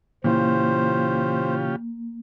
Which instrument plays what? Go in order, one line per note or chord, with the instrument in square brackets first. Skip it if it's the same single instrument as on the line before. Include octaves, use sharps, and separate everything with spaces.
[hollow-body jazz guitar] A#2 E3 [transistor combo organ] C#3 F4 G4 [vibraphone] A#3 [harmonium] C5